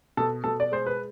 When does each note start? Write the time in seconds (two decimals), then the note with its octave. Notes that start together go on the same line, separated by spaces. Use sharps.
0.17 B2 A4
0.44 B2 A4
0.60 D5
0.72 G#3 C5
0.86 B4